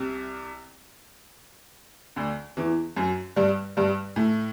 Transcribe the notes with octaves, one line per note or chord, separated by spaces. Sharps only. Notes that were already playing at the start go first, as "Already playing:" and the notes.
Already playing: C2 C3
D2 D3
E2 E3
F#2 F#3
G2 G3
G2 G3
A2 A3